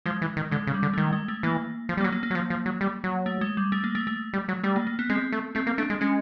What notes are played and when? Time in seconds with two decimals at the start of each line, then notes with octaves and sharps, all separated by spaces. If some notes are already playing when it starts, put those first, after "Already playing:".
0.06 F3 G#3
0.22 E3
0.37 D#3
0.51 D3 G#3
0.67 C#3
0.74 G3
0.83 D3
0.93 A3
0.97 D#3 G#3
1.13 G#3
1.28 A3
1.43 E3 A#3
1.89 F3
1.97 G3
2.01 A#3
2.04 F#3
2.12 A#3
2.23 A#3
2.31 F#3
2.35 F3
2.50 F3
2.66 F#3
2.81 G3
3.04 F#3
3.26 A3
3.41 G#3
3.57 G3
3.72 A3
3.84 A#3
3.95 A3
4.07 A3
4.33 G3
4.48 F#3
4.63 G3 A3
4.76 A#3
4.87 A#3
4.99 B3
5.10 G#3 C4
5.32 A3
5.55 A3 C4
5.67 A#3
5.78 A3 D4
5.90 G#3
6.01 G#3 C#4